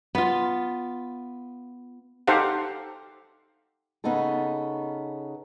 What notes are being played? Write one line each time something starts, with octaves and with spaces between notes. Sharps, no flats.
B3 F4
D#4 G4 A4 C5 F5 F#5
C#3 B3 C#4 D#4 A4